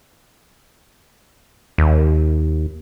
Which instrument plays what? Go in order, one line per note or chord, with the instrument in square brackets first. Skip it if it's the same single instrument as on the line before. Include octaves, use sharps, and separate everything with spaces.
[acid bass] D#2